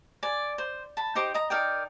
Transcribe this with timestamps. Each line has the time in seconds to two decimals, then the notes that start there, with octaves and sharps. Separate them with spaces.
0.23 D5 G#5
0.58 C5
0.97 A5 B5
1.15 D#4 G4 C5 D6
1.34 D#5 A#5
1.50 D#4 A#4 D5 G5